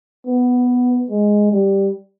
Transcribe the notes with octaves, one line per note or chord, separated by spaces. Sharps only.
B3
G#3
G3